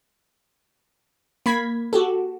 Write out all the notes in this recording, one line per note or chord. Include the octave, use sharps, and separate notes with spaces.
A#3 B5 G#6 B6
F#4 G4 A4